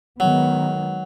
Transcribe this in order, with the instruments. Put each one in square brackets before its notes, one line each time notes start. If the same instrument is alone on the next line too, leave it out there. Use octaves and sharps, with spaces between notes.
[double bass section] D#3 G#3 B3 [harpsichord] F#3